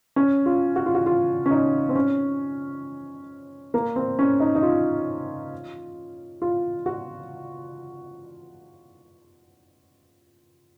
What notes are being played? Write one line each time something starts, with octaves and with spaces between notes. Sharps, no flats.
C#4
F4
F#4
F4
F#4
F4
C#4
D#4
C4
C#4
A#3
C4
C#4
D#4
D#4
F4
F4
F#4